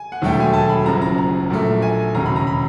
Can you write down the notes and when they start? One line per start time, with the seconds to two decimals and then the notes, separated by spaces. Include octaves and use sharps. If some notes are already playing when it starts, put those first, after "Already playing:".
Already playing: G#5
0.12 F#5
0.22 E1 D#2 D3 F#3 A3 G5
0.40 G#5
0.53 A5
0.69 B5
0.86 F#1 F#2 C#3 F3 A#5
1.02 A#5
1.18 A#5
1.50 A#1 A#2 F#3 A3
1.82 G#5
2.14 E1 D#2 C#3 A#5
2.26 B5
2.36 A#5
2.47 B5